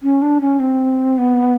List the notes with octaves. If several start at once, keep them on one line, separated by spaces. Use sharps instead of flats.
C#4
D4
C#4
C4
B3